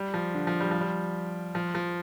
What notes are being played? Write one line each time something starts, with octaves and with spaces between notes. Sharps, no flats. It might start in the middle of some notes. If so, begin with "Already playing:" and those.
Already playing: G3
F3
D3
F3
G3
F3
G3
F3
F3